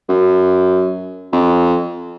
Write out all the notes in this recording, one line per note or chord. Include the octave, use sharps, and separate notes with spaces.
F#2
F2